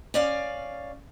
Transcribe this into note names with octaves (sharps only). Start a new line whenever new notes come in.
C#4 D5 F5